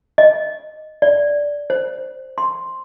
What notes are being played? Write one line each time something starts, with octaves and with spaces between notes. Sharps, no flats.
D#5
D5
C5
C6